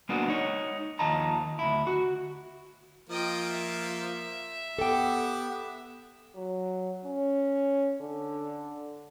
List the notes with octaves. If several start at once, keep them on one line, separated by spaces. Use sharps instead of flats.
G#3 A#3 B3 D4 F#4
D#4 C#5
D#2 F3 D#5 F5 A5 A#5
D2 E4
F#4
F3 A#3 F4 D#5 G5
E5
B3 G4 A4 F#5 G5 D6
F#3
C#4
D3